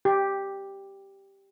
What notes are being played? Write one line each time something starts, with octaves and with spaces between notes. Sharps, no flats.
G4